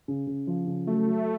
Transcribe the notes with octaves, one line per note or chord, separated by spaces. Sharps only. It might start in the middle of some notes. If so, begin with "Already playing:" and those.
C#3
C#3
F3
C#3
F#3 A3
F#3